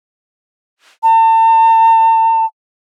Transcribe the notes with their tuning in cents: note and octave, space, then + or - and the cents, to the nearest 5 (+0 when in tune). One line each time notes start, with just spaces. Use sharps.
A5 +40